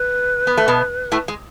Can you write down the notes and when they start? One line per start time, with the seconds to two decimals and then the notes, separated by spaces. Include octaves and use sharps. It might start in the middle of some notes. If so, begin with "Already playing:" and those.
Already playing: B4
0.47 B3
0.57 A3
0.68 B2 B3
1.12 A2 A3
1.28 G#3